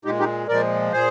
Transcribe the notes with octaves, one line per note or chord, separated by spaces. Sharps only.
A#2 G#3 D#4 G4
D#4 G4
A#2 F3 G#3 A#4 D5
A#2 G#4 C5